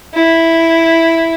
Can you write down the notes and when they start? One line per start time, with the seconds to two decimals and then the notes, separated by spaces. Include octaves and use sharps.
0.14 E4